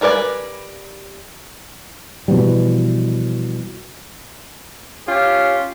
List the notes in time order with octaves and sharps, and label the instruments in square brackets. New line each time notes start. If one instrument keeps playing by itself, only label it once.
[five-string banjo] G3 A#4 B4 D5 G#5
[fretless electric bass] B2 E3 F3 G3
[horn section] C#4 F4 G4